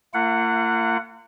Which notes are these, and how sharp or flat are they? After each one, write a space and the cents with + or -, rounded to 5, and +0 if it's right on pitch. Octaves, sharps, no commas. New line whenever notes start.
A#3 -40 F4 -45 F#5 +0